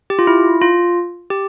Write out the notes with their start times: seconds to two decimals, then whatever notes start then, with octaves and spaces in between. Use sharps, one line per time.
0.10 G4
0.19 F4
0.27 E4
0.62 F4
1.30 G4